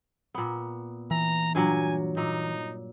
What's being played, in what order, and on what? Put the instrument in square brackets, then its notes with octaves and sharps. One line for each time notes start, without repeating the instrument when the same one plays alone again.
[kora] A#2 B3
[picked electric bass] E3 [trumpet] A#5
[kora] G2 A#2 F#3 [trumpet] G#5
[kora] A#2 [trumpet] D#4